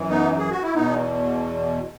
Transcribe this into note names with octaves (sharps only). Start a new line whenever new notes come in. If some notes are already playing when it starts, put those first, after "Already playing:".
Already playing: F#2 E3
B3 D#4
G#4
F#4
E4
E2 B2 B3 D#4